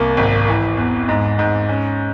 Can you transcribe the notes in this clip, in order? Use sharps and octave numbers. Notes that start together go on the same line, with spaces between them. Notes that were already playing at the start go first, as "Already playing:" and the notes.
Already playing: C2 A#3
G#1
E3
E2
G#2
G#2
C#4